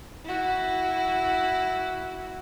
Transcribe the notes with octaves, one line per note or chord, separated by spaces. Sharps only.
E4 F#4